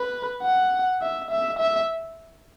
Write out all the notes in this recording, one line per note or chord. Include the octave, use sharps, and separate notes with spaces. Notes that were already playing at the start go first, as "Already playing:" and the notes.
Already playing: B4
F#5
E5
E5
E5